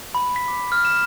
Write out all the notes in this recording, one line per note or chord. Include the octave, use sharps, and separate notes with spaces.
B5
B6
D6
F6
E7